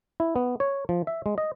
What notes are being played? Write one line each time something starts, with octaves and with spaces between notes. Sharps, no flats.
E4
B3
C#5
F3
E5
G#3
D#5